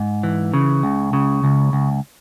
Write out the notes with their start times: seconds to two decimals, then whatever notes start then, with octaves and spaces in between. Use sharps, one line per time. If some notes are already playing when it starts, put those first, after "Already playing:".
Already playing: G#2
0.23 E3
0.54 C#3
0.83 C#2
1.13 C#3
1.44 C#2
1.73 C#2